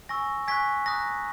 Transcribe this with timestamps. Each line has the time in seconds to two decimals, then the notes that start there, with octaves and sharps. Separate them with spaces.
0.09 G#5 C#6 E6 A#6
0.48 G#5 C#6 F#6 G#6 B6
0.86 A#5 D#6 F#6 A#6